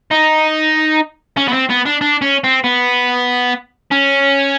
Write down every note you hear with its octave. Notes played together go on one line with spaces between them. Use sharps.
D#4
C#4
B3
C4
B3
D4
D4
C#4
C4
B3
C#4